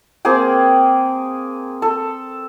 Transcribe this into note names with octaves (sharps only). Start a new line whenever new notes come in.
A#3 C4 G#4 G5
A4